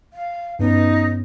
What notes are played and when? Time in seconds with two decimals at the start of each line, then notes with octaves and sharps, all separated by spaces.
0.13 F5
0.59 G2 B3 C#4 D#4